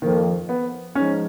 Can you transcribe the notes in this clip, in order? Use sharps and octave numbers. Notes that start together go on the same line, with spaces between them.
F2 D#3 F3 A#3
B3
G#2 F3 G#3 C#4 D#4